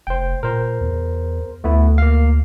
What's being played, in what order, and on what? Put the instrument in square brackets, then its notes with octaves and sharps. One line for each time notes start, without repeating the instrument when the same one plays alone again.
[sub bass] F1 [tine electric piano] C5 G5
[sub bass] A#2 [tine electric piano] A#4 C5
[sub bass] E2
[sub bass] D2 [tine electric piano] A3 B3 E4
[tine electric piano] A#3 F5